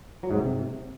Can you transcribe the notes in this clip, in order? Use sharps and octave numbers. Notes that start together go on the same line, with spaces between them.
F#3
G#2
C3